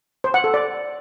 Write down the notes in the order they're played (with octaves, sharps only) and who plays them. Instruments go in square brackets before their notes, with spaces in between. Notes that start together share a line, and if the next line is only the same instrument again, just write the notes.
[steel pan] C5
F#5
A4
D5